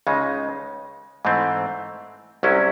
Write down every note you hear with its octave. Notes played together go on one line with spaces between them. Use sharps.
C#2 C#3 G#3 D#4
G#2 E3 A3 C4
C2 C3 F#3 C#4 E4